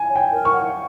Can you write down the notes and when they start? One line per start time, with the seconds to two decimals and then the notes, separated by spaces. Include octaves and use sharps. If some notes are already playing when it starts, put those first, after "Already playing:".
Already playing: G#5
0.09 C#5
0.16 G5
0.31 A#4
0.45 C#6
0.53 F#5